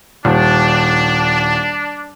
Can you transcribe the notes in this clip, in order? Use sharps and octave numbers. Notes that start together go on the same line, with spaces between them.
D#1 D4